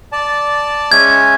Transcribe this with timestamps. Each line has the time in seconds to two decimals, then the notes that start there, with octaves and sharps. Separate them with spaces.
0.12 D5 A5
0.92 G#3 C#4 E5 G#6